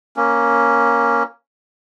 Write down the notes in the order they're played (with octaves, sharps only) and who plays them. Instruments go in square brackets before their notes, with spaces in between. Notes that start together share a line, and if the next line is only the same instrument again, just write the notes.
[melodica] A#3 C#4